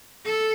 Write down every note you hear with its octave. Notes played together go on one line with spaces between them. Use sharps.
A4